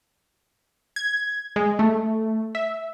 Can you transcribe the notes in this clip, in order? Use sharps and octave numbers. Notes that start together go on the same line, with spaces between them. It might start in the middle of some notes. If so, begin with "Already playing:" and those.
G#6
G#3
A3
E5